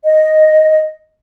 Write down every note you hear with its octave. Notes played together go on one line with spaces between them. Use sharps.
D#5